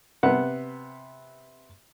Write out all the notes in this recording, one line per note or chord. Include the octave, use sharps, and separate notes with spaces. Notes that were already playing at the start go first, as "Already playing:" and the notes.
C3 B3 F#5